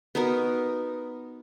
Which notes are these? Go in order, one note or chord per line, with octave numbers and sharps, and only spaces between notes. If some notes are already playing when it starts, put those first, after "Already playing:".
B3 D#4 F#4 A#4